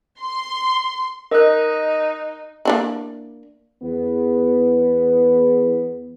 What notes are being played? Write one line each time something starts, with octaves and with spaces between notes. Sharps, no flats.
C6
D#4 A#4 D#5 F#6
A#3 D4 E4
E2 B3